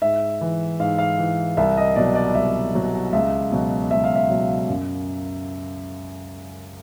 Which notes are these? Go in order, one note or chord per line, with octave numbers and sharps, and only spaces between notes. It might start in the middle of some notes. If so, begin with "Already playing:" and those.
G#2 E5
E3
G#2 F5
F5
E3
C2 E5
D#5
B2 F#3 D5
D5
C2 E5
B2 F#3
C#2 E5
B2 F#3
C#2 E5
F5
E5
B2 F#3
F#2